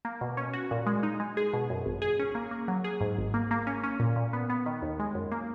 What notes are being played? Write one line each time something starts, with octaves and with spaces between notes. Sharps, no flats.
A#3
B2
C#4
F#4
A#2
G#3
D#4
G#3
G#4
B2
F#2
G#1
G#4
C#4
A#3
A#3
F#3
G#4
G#2
G#1
A#3
A#3
C#4
C#4
A#2
A#2
B3
B3
D#3
D#2
G#3
F#2
A#3